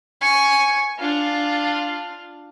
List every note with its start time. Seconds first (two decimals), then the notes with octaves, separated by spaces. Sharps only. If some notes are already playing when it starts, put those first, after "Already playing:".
0.21 G#5 C#6
0.98 D4 F4